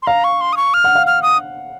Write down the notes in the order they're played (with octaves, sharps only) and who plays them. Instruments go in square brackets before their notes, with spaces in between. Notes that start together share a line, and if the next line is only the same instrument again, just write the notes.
[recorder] C6
[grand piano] F5 [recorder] A#5
[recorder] C#6
C6
D#6
C#6
F6
[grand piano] F#5
F5
[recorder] F6
D#6